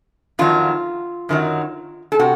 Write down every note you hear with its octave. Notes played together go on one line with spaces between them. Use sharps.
F2 D#3 F#3 F4
F#2 D#3 F#3
A4
C3 F#4